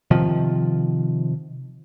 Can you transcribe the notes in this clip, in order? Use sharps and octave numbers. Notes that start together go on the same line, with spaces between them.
C3 D#3 F3